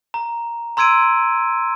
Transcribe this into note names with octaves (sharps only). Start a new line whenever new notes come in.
A#5
A#5 C6 E6 G#6 D7 D#7